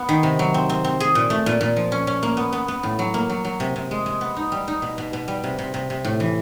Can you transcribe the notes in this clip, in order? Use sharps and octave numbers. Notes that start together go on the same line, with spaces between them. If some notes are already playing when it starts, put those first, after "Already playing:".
Already playing: B3
D#3
C3
F#3
C4
C4
C4
G#4
A#2
A3
A#2
A#2
F3
C#4
C#4
A#3
B3
B3
B3
A2
F#3
A#3
F#3
F#3
C3
C3
G#3
G#3
B3
D#4
G3
D#4
B2
B2
B2
G3
C3
C3
C3
C3
A2
E3